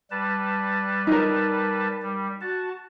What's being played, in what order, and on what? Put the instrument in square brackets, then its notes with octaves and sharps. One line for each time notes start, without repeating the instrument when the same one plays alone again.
[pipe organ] G3 B4 A5
[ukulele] D#4 A#4
[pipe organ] G3
F#4 A5